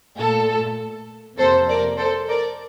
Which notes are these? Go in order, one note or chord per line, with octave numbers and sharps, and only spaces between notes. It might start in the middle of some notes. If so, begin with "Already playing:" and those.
A#2 A3 A4
F2 C3 F3 A#3 A4 C5
A#4 D5
A4 C5
A#4 D5